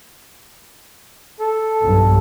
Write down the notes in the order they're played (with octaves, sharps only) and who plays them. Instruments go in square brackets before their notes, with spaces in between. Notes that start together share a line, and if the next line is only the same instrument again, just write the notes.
[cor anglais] A4
[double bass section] B1 G2